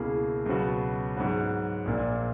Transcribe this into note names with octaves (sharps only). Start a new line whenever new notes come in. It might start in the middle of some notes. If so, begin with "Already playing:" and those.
Already playing: C#2 B2 A#3 E4 G#4
C#2 B2 F#3 B3 F#4
G#2 F#3 B3 F#4
A#1 A#2 A#3